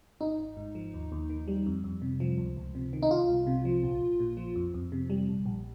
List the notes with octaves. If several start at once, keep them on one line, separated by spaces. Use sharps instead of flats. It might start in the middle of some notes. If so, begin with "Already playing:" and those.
G#1 D#4
G#1
G#2
F3
D#2
D#2
D#3
G3
F2
F2
C3
F3
C#2
C#2
C3
D#3
D#4
C2 F4
C2
C3
F3
A#1
A#1
A#2
F3
F2
F2
C3
G3
A#1
A#1